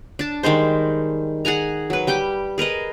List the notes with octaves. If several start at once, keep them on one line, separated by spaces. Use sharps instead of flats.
D4 A5
D#3 G3 G#3 C5
G#4 F#5 G#5 A#5
F#3 B4
G3 G4 G5 D6
G#4 A#4 B4 D#5